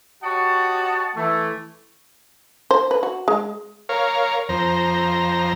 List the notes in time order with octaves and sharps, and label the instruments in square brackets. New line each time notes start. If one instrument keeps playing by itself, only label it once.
[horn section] F#4 G4 C#5 D#5 F#5 A5
E3 A3
[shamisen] C5
B4
F#4
G#3
[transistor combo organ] A#4 C#5 F5
F2 C5 A#5